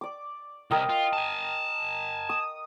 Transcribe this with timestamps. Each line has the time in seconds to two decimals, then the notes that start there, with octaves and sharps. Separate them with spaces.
0.01 D5 D6
0.71 C2 A#4 D#5 G5
0.89 F4
1.13 G#5 A5
2.29 D#6